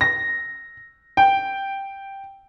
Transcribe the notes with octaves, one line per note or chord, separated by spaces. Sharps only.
A#6
G5